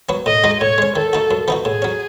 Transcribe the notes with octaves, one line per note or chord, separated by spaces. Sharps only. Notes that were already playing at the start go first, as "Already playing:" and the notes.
F#3 B3 F#4
A2 D#5
G#3 D#4 F#4
A2 C#5
G#3 C#4
D#3 A4
A3 D#4 F#4
F#2
E3 B3 D#4 F#4
A2 G#4
F#3 C#4